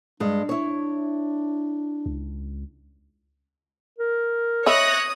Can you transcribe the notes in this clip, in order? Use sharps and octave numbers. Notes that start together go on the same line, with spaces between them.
G2 G#3 D4
E4 C#5
C#2
A#4
C#5 D#5 E5 B5 D#6 F#6 A#6